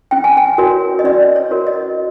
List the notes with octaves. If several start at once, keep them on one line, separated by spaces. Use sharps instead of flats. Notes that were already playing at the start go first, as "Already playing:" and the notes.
C#4 G5
G#5
G5
F#4 A#4 C#5
D#5
C#4 D5
C#5
F#4 A#4 C#5
D#5